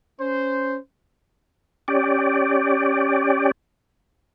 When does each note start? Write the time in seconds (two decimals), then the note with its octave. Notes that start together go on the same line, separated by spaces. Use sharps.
0.20 C#4 C5
1.88 C#4 G4 D5